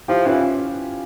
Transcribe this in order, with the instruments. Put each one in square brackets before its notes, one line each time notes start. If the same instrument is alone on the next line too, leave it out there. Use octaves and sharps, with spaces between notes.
[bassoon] F3 [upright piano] E4 G4
[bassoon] E3 [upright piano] C#4 F4